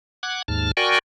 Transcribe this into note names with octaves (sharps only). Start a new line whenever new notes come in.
F#5 D6 F#6 G#6
D#2 G#2 A5 F6
F#4 A#4 D5 G5 G#5 C#6